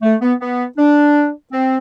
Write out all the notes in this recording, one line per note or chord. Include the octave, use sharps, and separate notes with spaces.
A3
B3
B3
D4
C4